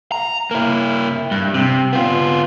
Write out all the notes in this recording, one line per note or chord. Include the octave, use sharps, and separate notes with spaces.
A#5
A#3 E4
G2
C3
B3 F4